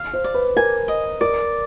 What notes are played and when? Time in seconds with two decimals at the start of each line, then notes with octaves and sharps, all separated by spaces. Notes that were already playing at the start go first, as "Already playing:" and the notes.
Already playing: F5
0.13 C5
0.24 D5
0.34 B4
0.56 A#4 G#5
0.88 D#5
1.21 A#4 D5